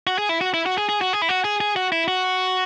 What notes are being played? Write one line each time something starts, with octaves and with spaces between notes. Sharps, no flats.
F#4
G#4
E4
F#4
E4
F#4
G#4
G#4
F#4
G#4
E4
F#4
G#4
G#4
F#4
E4
F#4